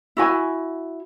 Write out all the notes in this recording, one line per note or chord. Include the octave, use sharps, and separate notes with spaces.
E4 F#4 G#5